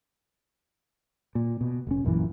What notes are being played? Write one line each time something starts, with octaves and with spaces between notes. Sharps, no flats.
A#2
B2
F1 C#4
A#1 F#2 A#2 E3